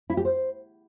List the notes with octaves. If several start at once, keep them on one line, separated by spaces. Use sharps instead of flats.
E4
G4
C5